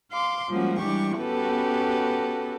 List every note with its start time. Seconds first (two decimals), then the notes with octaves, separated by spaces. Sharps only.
0.12 F5 C6 D6
0.51 F3 G3 G#3 A#3 C#4 F#4
0.79 E3 G3 D4 G4 C#6
1.19 B3 C#4 F#4 G4 A4 B4